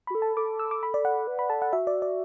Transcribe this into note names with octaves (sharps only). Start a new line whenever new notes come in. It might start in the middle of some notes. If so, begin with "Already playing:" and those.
F#4 B5
A4
A5
A4 D6
E6
D6
B5
D5
F#5
B4
B5
A4 A5
F#5
F#4 E5
D5
D5